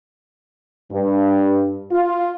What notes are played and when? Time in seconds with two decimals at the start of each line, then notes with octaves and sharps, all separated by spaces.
0.91 G2
1.92 F4